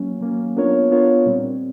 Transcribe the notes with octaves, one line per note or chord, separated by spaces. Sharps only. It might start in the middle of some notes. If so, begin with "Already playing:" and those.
Already playing: F#3 A#3 C#4
F#3 A#3 C#4
B3 D4 F4 A#4 C#5
B3 D4 F4 A#4 C#5
A#2 G3 C4